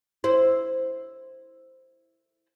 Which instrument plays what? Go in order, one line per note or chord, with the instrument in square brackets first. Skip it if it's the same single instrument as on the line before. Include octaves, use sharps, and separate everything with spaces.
[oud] E4 C5